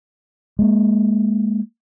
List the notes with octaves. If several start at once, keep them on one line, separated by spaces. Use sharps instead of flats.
G#3 A#3